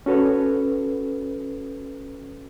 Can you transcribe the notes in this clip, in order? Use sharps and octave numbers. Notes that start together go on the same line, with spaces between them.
C#4 F#4 A4 B4 C#5